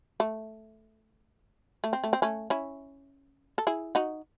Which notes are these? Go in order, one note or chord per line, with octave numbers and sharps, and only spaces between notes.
A3
A3
C4
A3
C4
A3 C#4
C#4 E4
A4
E4 G#4
D#4 F#4